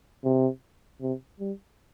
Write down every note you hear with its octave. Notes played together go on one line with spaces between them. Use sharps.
C3
C3
G3